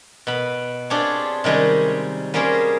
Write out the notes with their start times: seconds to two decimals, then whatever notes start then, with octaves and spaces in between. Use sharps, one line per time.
0.27 B2 B5
0.90 C4 D4 F4 G4 G#4 C#5
1.44 C3 D#3 G3 G#3 C#4
2.34 G3 A#3 C#4 G#4 A#4 C5